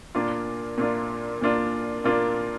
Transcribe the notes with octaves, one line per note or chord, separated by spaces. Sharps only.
A#2 A#3 D4 F4
A#2 A#3 D4 F4
A#2 A#3 D4 F4
A#2 A#3 D4 F4